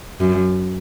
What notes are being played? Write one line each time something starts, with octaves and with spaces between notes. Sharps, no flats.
F#2